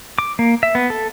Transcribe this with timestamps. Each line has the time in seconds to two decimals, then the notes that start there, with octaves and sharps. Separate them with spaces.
0.19 D6
0.39 A#3
0.63 E5
0.75 B3
0.90 A4